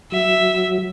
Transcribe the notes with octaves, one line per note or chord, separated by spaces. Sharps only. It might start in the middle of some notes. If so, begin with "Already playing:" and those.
F#3 E5